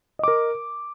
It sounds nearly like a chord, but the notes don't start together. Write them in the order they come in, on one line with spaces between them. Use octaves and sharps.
D#5 D6 A#4